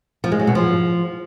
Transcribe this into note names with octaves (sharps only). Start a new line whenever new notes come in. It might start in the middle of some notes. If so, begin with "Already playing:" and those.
F3
G#3
F#3
B2
F3